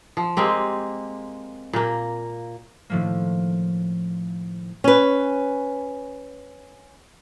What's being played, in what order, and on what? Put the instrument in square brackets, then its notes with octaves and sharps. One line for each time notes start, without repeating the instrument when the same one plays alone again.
[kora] F3
G#3 A#3 C4 G4
A#2 A#3
[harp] A2 D#3 F3 A3 A#3
[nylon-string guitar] C#4 B4